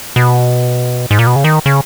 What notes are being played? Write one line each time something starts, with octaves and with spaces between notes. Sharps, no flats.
B2
G#2
A#2
B2
C#3
D#3
C#3